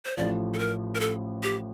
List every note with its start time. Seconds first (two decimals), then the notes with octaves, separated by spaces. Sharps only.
0.05 C5
0.17 A1 A2 F3 D5
0.54 A4
0.59 A#4
0.95 A#4
1.00 A4
1.43 G4